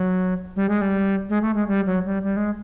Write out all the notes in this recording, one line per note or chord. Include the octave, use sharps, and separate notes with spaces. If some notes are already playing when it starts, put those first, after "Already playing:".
Already playing: F#3
G3
G#3
G3
G#3
A3
G#3
G3
F#3
G3
G3
G#3